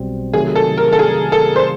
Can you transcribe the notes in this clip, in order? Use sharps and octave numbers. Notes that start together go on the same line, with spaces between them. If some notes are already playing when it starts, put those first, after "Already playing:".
Already playing: B1 B2 G3 C4
C3 D#3 F#3 A3 G#4
A4
A#4
A4
G#4
A4
C5